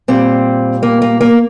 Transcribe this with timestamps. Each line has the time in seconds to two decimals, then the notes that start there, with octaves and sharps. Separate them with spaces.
0.08 A#2 G3 C4
0.83 A#3
1.02 A#3
1.21 A#3